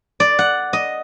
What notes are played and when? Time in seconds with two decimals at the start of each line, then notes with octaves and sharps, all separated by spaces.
0.20 D5
0.39 F#5
0.73 D#5